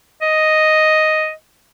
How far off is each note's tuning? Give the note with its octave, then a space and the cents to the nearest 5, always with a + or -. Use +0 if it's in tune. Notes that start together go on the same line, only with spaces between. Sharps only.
D#5 +0